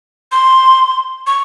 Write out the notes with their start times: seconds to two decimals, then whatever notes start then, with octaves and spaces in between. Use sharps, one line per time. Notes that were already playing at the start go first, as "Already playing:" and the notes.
0.32 C6
1.27 C#6